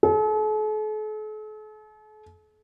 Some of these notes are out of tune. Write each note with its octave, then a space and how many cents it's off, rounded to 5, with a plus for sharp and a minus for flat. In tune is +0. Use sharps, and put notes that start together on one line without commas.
A4 -45